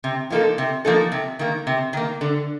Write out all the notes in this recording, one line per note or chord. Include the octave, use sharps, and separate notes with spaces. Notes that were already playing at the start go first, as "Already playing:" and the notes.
C3
F3 A#3 D#4 A4
C3
F3 A#3 D#4 A4
C3
D#3 A#3
C3
D#3 A#3
D3